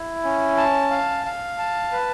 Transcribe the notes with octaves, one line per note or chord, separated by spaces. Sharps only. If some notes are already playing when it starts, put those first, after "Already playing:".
Already playing: E4
C#4
A5
F5
F5
A5
B4